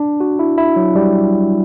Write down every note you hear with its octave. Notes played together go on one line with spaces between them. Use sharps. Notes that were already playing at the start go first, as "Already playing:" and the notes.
Already playing: D4
F#4
E4
E4
F#3
G3